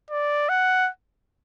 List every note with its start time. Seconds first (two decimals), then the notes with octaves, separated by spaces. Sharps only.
0.10 D5
0.49 F#5